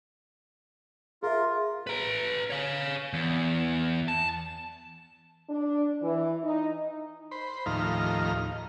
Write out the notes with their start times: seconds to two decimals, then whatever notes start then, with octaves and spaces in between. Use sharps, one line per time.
1.23 F4 G#4 A#4 E5
1.87 B4 A#5
2.50 C#5 F5
3.13 E2
4.08 A5
5.49 D4
6.02 E3
6.43 D#4
7.31 C5 B5
7.66 D#2 A2 F3 D#4 A#5 F6